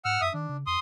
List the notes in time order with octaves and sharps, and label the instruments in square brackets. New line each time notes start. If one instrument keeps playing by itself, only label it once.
[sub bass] G#2 [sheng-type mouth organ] F#5 E6 F6
[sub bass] F#2 [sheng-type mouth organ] E5 D#6
[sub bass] D#3 [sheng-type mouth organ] D4
[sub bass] C#3
[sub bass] F2 [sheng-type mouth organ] C6 D#6